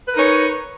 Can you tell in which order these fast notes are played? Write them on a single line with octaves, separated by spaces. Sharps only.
B4 A#4 D#4 C#5